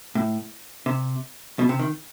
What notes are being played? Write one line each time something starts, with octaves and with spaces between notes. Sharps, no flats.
A2
C3
B2
C3
D#3